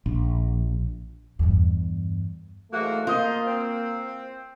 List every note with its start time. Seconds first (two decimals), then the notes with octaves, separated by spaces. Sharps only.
0.06 A#1
1.39 E2 G2
2.72 G#2 E3 F#3 A3 A#3 F#4
3.07 A#3 F4 C5 D#5
3.46 C4